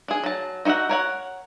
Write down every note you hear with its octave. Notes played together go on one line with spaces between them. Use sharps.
D4 G#4
F#3 A5
D#4 F#4 C5 E5 F#5
A#4 C#5 F#5